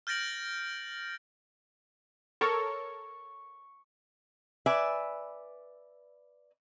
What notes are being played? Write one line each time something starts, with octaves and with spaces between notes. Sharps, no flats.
F6 G6 A6 A#6 D7 F#7
A4 A#4 C#5 C#6
B4 D5 E5 G#5